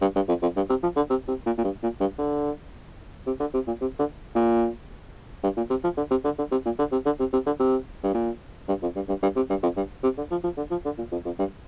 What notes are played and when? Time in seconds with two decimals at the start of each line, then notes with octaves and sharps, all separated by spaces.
0.01 G2
0.15 G2
0.28 F2
0.42 F2
0.56 G2
0.69 C3
0.83 F3
0.96 D3
1.10 C3
1.28 C3
1.46 A#2
1.58 A#2
1.64 G2
1.82 A#2
2.00 G2
2.18 D3
3.26 C3
3.40 D3
3.54 C3
3.67 A#2
3.81 C3
3.99 D3
4.35 A#2
5.43 G2
5.57 A#2
5.70 C3
5.84 F3
5.97 D3
6.10 C3
6.24 D3
6.38 D3
6.51 C3
6.65 A#2
6.79 D3
6.92 C3
7.06 D3
7.20 C3
7.33 C3
7.46 D3
7.60 C3
8.03 G2
8.14 A#2
8.68 G2
8.82 F2
8.95 G2
9.08 G2
9.22 G2
9.36 C3
9.50 G2
9.63 F2
9.76 G2
10.03 C3
10.17 D3
10.31 F3
10.44 F3
10.57 D3
10.71 F3
10.85 D3
10.98 A#2
11.12 F2
11.25 F2
11.39 G2